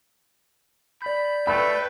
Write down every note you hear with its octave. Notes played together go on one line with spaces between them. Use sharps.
D5 B5 G6
A3 B4 G5 B5